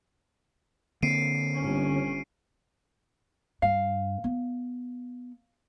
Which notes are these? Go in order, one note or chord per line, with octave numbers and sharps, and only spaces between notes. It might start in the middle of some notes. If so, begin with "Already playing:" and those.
D3 A#3 C4 C7 D7 D#7
G1 C#4
G2 F5
B3